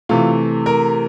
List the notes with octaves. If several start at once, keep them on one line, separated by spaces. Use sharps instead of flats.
C3 E3 A3 F4
A#4